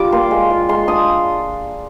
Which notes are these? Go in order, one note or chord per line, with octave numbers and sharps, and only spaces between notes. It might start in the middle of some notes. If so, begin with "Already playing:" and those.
Already playing: G3 D4 F4 D6
A#3 C6
G#3
F4
G#3 C6
D4 D#6